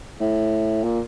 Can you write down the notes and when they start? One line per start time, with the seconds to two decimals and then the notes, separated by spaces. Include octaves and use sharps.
0.20 A2
0.84 A#2